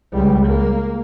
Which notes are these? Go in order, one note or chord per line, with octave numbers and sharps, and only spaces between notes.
C#2 G3
A#3